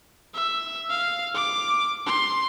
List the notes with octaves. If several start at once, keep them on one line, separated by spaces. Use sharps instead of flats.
E5
F5
D6
C6